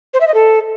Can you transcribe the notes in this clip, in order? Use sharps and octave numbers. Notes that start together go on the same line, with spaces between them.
C5
E5
D#5
A4